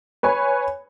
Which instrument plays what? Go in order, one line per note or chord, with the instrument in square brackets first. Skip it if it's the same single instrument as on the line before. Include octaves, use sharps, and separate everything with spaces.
[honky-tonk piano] B4 C#5 G#5 B5